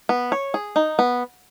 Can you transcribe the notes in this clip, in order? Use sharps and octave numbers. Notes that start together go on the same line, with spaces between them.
B3
C#5
G#4
D#4
B3